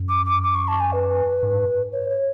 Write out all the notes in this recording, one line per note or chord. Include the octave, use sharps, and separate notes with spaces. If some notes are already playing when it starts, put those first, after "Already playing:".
Already playing: F#2
D6
D6
D6
C#6
A5
G#5
B4
G#2
C#5
C#5